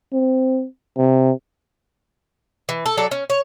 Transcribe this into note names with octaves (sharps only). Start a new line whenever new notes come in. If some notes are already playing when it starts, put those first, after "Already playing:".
C4
C3
E3
A4
F#3 A4 D5
C#4
C#5